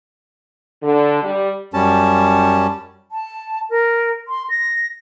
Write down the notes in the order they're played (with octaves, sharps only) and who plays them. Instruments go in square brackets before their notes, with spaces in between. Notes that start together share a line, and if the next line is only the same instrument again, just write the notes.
[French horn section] D3
G3
[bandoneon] F#2 G3 C#4 A5
[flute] A5
A#4
C6
A#6